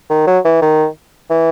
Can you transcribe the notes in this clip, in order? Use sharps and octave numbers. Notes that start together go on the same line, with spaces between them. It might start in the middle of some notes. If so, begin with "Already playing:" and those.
D#3
F#3
E3
D#3
E3